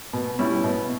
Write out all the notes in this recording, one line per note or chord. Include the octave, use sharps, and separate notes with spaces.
B2
G3 C#4 E4
B2